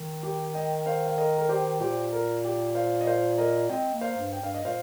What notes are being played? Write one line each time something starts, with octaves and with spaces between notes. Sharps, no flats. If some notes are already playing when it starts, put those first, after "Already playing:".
Already playing: D#3
G4
D#5 G5
C5 F5
F5
A#4 D#5
A#4
G4 C5
A#2 G4 C5
A#4
G4
C5 F5
D#5
C5 F5
A#4 D#5
C4 D#5 G5
A#3
C5 F5
G2
G5
G2 F5
D#5
A#2 C5 F5